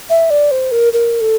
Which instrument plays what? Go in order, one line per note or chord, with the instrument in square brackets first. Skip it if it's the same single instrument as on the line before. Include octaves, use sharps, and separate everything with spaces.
[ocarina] E5
D5
C5
A#4
A#4
A4